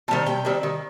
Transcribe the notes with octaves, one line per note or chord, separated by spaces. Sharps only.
D#3 G3 C4 A5
C3 G5
D#3 G3 C4
D#3